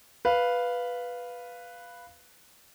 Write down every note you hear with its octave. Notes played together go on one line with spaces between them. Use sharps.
B4 F5